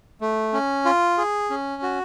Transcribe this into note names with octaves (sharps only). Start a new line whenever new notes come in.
A3
C#4
F4
G#4
C#4
F#4